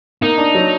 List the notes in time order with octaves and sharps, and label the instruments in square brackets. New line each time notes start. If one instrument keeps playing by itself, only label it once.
[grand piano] A#3 [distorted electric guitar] D#4
[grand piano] D4
F#3